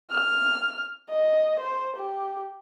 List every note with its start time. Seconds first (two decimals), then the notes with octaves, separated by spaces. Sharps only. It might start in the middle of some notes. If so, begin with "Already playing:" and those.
0.11 F6
1.10 D#5
1.60 C5
1.96 G4